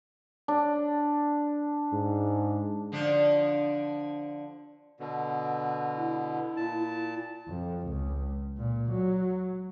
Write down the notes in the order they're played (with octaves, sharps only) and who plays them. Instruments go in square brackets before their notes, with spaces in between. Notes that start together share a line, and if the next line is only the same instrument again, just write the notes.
[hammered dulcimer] D4
[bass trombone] G#2
[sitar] D3 F3 D4
[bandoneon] B2 D3
[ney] E4
[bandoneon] A#2 A5
[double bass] F2
C#2
A#2
F#3